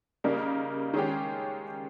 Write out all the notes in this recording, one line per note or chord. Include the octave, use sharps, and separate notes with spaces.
C#3 G3 A#3 D#4 A#4
D#3 G#3 C#4 G4